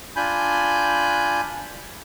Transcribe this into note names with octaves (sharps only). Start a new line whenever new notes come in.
D4 F4 G#5 B5 G6